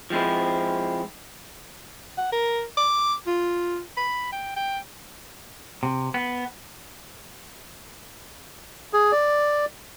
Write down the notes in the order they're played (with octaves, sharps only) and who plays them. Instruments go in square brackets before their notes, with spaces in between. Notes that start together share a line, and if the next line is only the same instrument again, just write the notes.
[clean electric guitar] F3 G#3 C4 E4
[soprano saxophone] F#5
A#4
D6
F4
B5
G5
G5
[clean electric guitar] C3
B3
[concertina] G#4
D5